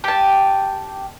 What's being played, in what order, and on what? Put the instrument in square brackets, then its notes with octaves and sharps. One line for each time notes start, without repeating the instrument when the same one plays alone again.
[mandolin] G4 A5